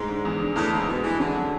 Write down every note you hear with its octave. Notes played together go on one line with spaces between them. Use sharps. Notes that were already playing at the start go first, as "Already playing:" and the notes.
Already playing: G#2 G#3
D3
E2
D3
E2 A2
G#2 G#3
E2 B2
E3 G#3
D3 C#4
F#3